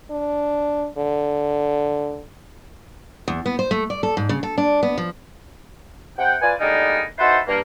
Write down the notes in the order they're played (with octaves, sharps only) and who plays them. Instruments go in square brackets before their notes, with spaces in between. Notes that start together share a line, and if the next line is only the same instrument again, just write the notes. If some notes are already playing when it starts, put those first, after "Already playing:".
[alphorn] D4
D3
[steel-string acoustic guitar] E2
B3
C5
A3
D5
A4
G#2
C#3
A4
D4
B3
F3
[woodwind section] C3 F#5 G5
F4 B4 D5 G#5
D3 G3 G#3 A#3 B3 D#4
D#4 E4 F#4 A4 B4 C5
G2 A#3